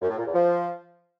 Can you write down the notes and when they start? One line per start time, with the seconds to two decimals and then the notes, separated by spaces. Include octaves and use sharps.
0.01 F#2
0.09 A2
0.17 A#2
0.25 E2
0.33 F3